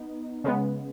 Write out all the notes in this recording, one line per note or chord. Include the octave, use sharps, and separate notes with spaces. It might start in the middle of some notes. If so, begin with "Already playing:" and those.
Already playing: B3 D#4
C#3 G#3 B3